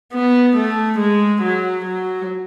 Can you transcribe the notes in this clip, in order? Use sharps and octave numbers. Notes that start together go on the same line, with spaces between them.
B3
A3
G#3
F#3
F#3